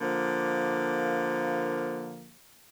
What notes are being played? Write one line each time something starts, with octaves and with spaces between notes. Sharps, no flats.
D3 F3 A#3